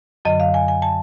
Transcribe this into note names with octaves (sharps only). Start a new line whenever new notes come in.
F#2 D3 F#3 D#5
F5
G#5
G#5
A5